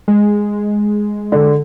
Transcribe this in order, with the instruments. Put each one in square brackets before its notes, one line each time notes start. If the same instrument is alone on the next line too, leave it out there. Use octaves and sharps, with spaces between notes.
[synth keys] G#3
[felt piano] D3